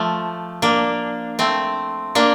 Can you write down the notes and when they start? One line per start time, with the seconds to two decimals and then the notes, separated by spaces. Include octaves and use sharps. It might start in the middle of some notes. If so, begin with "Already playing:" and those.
Already playing: F3 A3
0.62 A#3 D4
1.39 A3 C4
2.15 A#3 D4